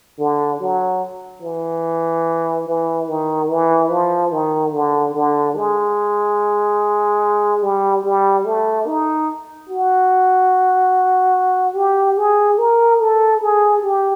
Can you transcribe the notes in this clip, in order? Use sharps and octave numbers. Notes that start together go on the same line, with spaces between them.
D3
F#3
E3
E3
D#3
E3
F3
D#3
D3
D3
G#3
G3
G3
A3
D#4
F#4
G4
G#4
A#4
A4
G#4
G4